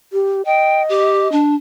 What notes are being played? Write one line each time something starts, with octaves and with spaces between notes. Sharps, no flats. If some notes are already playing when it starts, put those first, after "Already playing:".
G4
D#5 G5
G4
D4